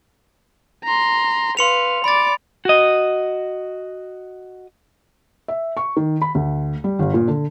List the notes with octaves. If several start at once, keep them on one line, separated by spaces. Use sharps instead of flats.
A#5 C6
B4 F5 C6 C#7 F7
D5 B5 D6 A6
F#4 D#5
E5
C#6
D#3
B5
D2
G3
G1
A#2
D3